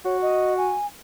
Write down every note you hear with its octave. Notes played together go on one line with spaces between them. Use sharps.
F#4 C#5
D#5
G#5